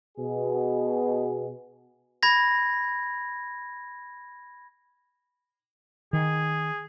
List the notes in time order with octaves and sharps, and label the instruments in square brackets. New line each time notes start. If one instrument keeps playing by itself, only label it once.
[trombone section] B2 G#4
[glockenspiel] B5 G#6 A#6
[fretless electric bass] D#3 [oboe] G#4